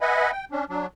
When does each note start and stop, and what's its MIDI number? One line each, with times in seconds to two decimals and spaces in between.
0.01 0.31 71
0.01 0.31 75
0.01 0.31 76
0.01 0.31 78
0.01 0.31 80
0.01 0.31 83
0.32 0.45 79
0.52 0.65 61
0.52 0.65 62
0.69 0.86 54
0.69 0.86 62